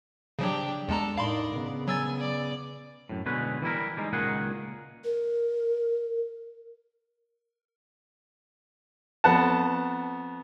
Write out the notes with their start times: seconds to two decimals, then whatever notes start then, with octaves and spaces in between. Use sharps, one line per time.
0.39 C#3 F3 F#3 D4 G4
0.88 E2 G#3 A4 A#5
1.18 A2 D#4 A#4 D5 F5 B5 C6
1.52 C#3 B3
1.88 F#3 G#5 E6 A6
2.19 D5
3.09 F#2 A2
3.26 B2 D3 G#3 C#4 B4
3.62 E3 G3 E4 A#4
3.97 G3 G#3 D#4
4.13 C#2 A#2 D#3 A#3 G#4 F#5
5.04 A#4
9.24 F2 B3 F#5 A5